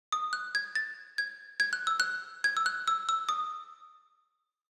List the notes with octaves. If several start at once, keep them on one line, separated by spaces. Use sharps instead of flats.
D#6
F#6
G#6
A6
G#6
G#6
F#6
E6
F#6
G#6
E6
F#6
E6
E6
D#6